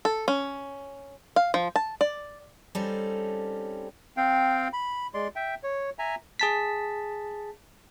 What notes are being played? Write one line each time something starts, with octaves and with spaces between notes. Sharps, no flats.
A4
C#4
F5
F3
A5
D5
G3 C4 C#4 D#4 A4
C4 F5 G5
B5
G#3 D5 C6
E5 G5
C#5
E5 G#5 A#5
G#4 A5 B6